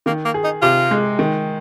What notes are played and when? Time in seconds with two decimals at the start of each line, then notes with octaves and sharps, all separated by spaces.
0.06 D#3 A#3
0.25 A#3
0.34 G#4
0.44 D#4
0.62 C3 F4
0.91 G#3
1.19 D#3